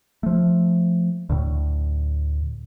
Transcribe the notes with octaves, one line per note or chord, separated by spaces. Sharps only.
F3 A3
D2 A2